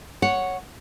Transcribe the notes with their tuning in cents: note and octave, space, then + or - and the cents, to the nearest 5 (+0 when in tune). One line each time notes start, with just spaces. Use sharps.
C#5 +0 F#5 -5